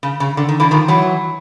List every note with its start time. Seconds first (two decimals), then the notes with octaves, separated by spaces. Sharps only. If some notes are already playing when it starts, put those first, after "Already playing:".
0.03 C#3
0.20 C#3
0.37 D3
0.49 D#3
0.60 D3 E3
0.71 D#3 F3
0.88 E3 F#3